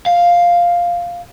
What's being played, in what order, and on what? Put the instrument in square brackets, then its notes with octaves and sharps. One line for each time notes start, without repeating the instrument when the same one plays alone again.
[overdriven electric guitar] F5